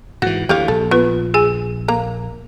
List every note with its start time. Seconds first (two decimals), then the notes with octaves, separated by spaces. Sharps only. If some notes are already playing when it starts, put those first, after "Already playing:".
0.22 G#2 E3 F#4
0.49 D2 E3 G4 C#5 F5
0.68 A#1 A4
0.91 B3 F4 B4
1.34 G#4 G#5
1.88 A#3 A#5